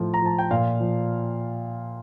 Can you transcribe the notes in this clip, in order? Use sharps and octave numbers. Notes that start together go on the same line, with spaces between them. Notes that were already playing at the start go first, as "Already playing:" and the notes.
Already playing: A2 F3
A#5
F3 A5
G5
A#2 F5
F3